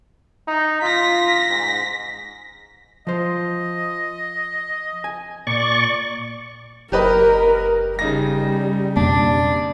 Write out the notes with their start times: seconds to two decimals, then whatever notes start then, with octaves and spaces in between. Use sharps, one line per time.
0.47 D#4
0.82 F4 A#6 B6
1.50 G#2
3.07 F3 C5 D#5
5.04 G#5
5.47 A#2 D5 C#6
6.92 F#1 G4 A#4 B4 D#5
7.99 C#3 G3 D#4 A#6
8.96 F2 B2 A#3 D4